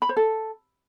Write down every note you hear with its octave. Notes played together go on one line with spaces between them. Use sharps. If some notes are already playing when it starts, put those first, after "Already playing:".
B5
C5
A4